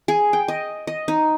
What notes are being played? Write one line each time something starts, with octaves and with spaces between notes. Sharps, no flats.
G#4
G5
D#5
D#5
D#4